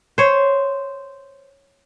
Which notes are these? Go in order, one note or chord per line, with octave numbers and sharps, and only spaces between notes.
C5 C#5